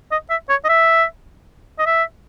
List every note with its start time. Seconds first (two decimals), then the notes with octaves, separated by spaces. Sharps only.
0.11 D#5
0.30 E5
0.49 C#5
0.65 D#5
0.69 E5
1.79 D#5
1.86 E5